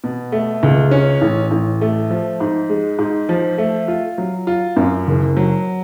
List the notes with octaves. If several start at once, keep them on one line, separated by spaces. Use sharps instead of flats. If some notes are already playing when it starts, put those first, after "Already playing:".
B2
A3
C#2
C#4
A1
A1
A3
F3
G#2
G#3
G#2
F3
A3
F4
F#3
F4
F#2
F#1
F#3